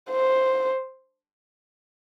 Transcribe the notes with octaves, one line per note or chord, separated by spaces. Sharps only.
C5